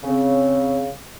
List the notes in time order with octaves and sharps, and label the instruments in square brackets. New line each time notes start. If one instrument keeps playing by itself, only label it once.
[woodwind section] C#3 C4